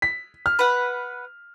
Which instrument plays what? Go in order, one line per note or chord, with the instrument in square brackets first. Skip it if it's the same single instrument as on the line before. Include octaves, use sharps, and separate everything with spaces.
[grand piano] B6
F6
[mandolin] B4 F#5